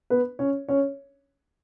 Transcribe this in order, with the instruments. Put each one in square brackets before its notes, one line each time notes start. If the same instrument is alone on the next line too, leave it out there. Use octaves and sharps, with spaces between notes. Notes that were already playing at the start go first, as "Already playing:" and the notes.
[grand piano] B3 B4
C#4 C#5
C#4 C#5